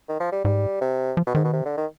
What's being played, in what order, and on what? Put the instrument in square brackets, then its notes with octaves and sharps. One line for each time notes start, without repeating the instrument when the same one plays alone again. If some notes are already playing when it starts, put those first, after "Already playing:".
[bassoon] D#3
F3
G3
[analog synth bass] G#2 [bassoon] G3
[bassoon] C3
[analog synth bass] F3
[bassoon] B2
[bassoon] G#2 [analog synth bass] D#3
[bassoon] B2
C3
D3
D#3